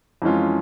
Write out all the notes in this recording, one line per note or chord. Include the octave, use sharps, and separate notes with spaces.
F2 E3 G#3 C#4 F4